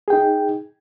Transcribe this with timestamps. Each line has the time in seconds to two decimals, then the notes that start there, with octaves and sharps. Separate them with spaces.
0.08 G#4
0.10 G5
0.13 D#4